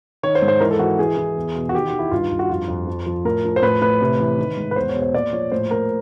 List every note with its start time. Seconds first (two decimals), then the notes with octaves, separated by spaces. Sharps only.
0.23 D#3 C#5
0.35 C5
0.42 G#2
0.48 C5
0.60 E3 A#4
0.71 A4
0.79 E3 F#4
0.99 E3 G#4
1.17 E3
1.36 E2
1.55 B2
1.69 F#4
1.74 D#3 G4
1.87 F#4
1.93 D#3
1.99 E4
2.11 G2 F4
2.31 G2
2.39 F#4
2.50 F2 F4
2.68 F2
2.87 F3
3.06 F3
3.25 A2 A#4
3.45 F3
3.56 C5
3.62 A2 B4
3.81 A2 B4
4.01 C3
4.20 E3
4.38 D#3
4.57 G#2
4.71 B4
4.76 E2 C5
4.89 C#5
4.95 B2
5.02 C5
5.14 A#2 D5
5.33 F3 C#5
5.52 A2 C5
5.71 A2 A#4